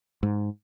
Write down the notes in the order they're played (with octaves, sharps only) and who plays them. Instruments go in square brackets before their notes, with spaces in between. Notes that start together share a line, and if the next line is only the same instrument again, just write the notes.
[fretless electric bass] G#2